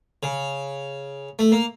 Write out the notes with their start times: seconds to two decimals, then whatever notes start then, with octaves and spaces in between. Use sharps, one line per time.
0.23 C#3
1.39 A3
1.52 A#3